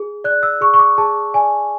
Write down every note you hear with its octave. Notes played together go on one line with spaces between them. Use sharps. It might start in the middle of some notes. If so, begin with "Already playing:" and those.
Already playing: G#4
D5 F#6
E6
G#4 C#6
C#6
D6
G#4 A5
D5 G#5